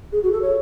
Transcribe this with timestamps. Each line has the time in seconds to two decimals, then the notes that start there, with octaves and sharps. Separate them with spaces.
0.12 G#4
0.23 F#4
0.31 A4
0.41 C#5